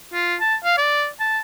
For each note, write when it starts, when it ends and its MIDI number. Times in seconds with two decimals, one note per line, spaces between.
0.13 0.35 65
0.40 0.55 81
0.64 0.77 77
0.77 1.07 74
1.20 1.39 81